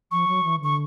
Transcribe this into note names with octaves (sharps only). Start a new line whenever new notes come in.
F3 C#6
F#3
E3
D3 C#6